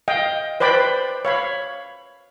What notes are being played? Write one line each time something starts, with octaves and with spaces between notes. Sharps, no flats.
D#5 F5 G5
B4 C5 D5 G5 B5
C#5 F5 B5